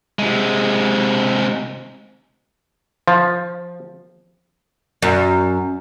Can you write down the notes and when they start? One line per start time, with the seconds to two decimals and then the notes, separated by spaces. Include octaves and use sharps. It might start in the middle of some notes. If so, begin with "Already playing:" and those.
0.19 C3 G#3
3.08 F3
5.02 F#2